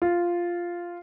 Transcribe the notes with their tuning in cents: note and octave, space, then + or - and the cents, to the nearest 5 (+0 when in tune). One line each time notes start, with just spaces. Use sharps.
F4 -5